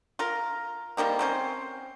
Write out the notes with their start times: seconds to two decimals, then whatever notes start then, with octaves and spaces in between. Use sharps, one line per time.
0.19 F4 A#4
0.97 D#3 G3 A#3 C4
1.19 C4 C#4 C5